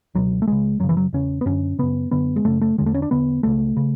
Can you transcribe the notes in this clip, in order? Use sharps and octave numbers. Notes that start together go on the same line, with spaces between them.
C#2 B2 F#3
A3
C#2 C#3 G#3
F#2 C#3 F#3
E3
F#3
E2 C#3 C#4
B3
F#2 D3 C#4
F#2 C#3 B3
F#2 D3 B3
G#3
F#2 C#3 A3
A3
E2 D3 G#3
A3
C#4
D4
E2 D3 B3
C#2 C#3 A3
C#3